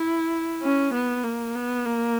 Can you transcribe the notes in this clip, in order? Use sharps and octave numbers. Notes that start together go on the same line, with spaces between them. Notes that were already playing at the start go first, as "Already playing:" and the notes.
Already playing: E4
C#4
B3
A#3
B3
A#3